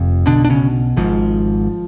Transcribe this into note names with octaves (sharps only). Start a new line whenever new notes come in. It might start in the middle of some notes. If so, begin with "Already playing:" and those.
Already playing: F1 F2
B1 B2 D3 D4
D4
C#3 C#4
G#1 G#2 F3